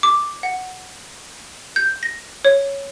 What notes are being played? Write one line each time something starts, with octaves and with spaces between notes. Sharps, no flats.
D6
F#5
G6
A#6
C#5